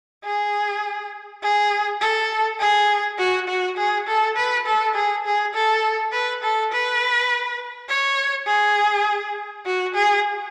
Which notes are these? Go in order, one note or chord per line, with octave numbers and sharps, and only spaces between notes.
G#4
G#4
A4
G#4
F#4
F#4
G#4
A4
B4
A4
G#4
G#4
A4
B4
A4
B4
C#5
G#4
F#4
G#4